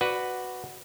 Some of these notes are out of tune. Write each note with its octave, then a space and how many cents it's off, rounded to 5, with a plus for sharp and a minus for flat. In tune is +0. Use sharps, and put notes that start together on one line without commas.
F#4 +0 B4 +0 D5 +0